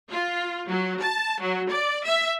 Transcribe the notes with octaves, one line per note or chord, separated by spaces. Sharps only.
F4
F#3
A5
F#3
D5
E5